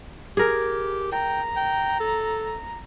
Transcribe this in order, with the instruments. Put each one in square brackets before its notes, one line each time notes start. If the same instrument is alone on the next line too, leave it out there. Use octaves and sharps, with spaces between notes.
[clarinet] G4 [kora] G#4 A#4
[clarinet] G5 [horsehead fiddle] A#5
[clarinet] G5
A4